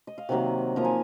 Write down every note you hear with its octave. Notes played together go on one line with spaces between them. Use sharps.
D#5
F5
C3 D#3 F#3 A#3 F#5
F3 A#3 D#4 A#5
G#5